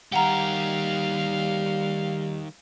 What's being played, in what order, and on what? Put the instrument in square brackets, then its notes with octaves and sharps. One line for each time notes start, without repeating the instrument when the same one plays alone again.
[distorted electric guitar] D#3 G4 [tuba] G3 [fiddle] F5 [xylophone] F#5 A#5